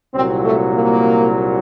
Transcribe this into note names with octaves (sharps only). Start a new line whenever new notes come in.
C2 A#2 F#3 C4
A3
A#3